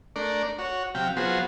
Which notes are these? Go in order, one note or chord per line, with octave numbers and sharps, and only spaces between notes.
A3 D4 A#4 D5
F#4 C#5
C3 F#3 G4 F5 G5
F#3 B3 F4 F#4 G#4 C5